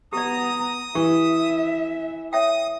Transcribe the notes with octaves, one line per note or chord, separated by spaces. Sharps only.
B3 G4 D5 A#5 D#6
E3 G4 E5
C#5 E5 G5 D#6